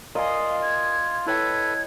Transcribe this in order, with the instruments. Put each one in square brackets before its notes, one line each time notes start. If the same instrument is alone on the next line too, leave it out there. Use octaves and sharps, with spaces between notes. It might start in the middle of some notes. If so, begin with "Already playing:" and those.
[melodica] F4 [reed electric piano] A#4 D5 G#5 [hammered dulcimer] D#5 [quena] F5
[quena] G#6
[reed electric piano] E4 C#5 G5 [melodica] A4 B4 [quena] G#6